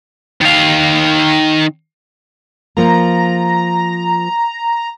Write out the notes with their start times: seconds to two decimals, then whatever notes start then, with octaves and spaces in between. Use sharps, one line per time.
0.41 D#3 F5
2.77 F3 A#3 A#5